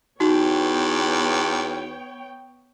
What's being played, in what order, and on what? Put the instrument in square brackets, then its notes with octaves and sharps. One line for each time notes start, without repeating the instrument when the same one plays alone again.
[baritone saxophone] E2 [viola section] B3 C#5 G5 [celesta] D#4 F#4